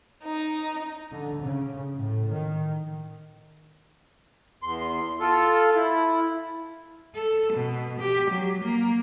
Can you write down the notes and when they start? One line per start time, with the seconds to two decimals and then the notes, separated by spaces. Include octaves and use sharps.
0.25 D#4
1.12 D3
1.42 C#3
1.96 A2
2.31 D#3
4.63 E2 C6
5.20 F4 A4
5.75 E4
7.15 A4
7.53 B2
8.00 G4
8.31 F#3
8.63 A#3